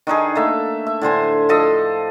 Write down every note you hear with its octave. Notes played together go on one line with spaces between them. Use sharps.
D#3 D4 D#4 G#4
A3 A#3 E5
E5
A2 D3 C5 G#5
F3 A4 D#5